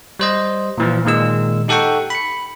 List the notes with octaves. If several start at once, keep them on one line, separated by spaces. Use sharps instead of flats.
G3 C5 D#5
A#2 E3 F3
A#2 D#3 G#3 E6
D#4 G4 A4 F#5 G5 C#6
B5 C#7